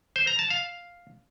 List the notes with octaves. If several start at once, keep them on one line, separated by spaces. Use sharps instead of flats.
C5
A#5
A5
F5